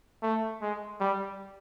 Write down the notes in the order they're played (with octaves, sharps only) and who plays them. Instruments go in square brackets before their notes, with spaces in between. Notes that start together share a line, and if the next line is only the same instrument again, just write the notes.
[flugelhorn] A3
G#3
G3